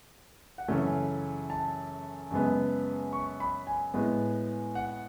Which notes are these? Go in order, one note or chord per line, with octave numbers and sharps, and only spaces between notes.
F#5
F#2 C#3 E3 A3 C#4 G#5
A5
F#2 C#3 G#3 B3
C#6
B5
G#5
A2 G#3 B3
F#5